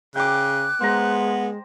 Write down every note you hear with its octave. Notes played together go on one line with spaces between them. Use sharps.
C#3 G5 D6 F#6
G#3 B3 C5 A#5